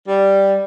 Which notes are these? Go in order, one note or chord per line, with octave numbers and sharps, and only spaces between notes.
G3